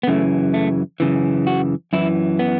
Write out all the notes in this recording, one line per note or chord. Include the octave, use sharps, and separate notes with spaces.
B3
F#2 C#3 E3 A3
A3
F#2 C#3 E3
F#4
F#2 E3 E4
B3